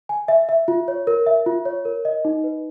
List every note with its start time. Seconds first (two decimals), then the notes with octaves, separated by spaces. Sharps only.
0.09 G#5
0.28 E5
0.49 E5
0.68 F4
0.88 C#5
1.07 A#4
1.26 E5
1.46 F4
1.65 C#5
1.85 A#4
2.05 D#5
2.25 D#4
2.44 B4